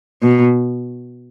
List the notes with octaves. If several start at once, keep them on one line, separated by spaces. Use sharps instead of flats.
B2